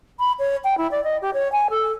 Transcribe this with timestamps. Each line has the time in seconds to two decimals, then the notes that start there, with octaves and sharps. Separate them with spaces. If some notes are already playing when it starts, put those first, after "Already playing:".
0.19 B5
0.39 C#5
0.64 G5
0.77 E4
0.91 D5
1.03 D#5
1.21 G4
1.33 C#5
1.52 G#5
1.70 A4